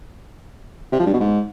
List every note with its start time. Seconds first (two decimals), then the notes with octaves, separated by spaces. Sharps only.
0.92 C3
0.99 F3
1.06 G2
1.13 B2
1.20 G#2